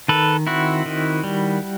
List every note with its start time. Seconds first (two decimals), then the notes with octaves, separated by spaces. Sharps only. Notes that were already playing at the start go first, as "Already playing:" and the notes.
0.08 D#3 A4 B4
0.47 C4 E4 F#4
0.86 D#3
1.24 G3